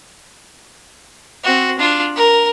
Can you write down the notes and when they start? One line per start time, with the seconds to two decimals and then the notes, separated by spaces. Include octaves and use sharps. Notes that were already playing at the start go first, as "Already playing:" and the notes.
1.44 C4 F#4
1.78 D4 F4
2.16 A#4